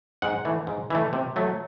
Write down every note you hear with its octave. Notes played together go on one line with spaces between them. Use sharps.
G#2 F#5
E3 A3
G#2
E3 A3
C3
F#3 A3